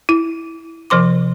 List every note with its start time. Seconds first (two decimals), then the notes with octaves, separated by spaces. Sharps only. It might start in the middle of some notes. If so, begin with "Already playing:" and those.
0.09 E4
0.90 C3 F3 C5 C6 D6